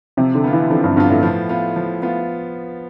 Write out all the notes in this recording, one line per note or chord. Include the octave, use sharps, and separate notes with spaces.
C3 F3
D3
B3 F4
E3
D3 F3
G2
G2 B3 F4
A2
F3
B3 F4
F3
B3 F4